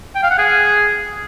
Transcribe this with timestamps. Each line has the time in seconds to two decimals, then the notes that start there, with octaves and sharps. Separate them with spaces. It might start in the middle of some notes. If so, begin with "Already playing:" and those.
0.15 G5
0.23 F5
0.31 F#5
0.38 G#4